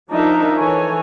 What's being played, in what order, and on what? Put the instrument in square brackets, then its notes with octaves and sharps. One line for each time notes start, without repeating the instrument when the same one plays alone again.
[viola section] F3 D4 D#4 A#4 E5
E3 A4 C#5 G#5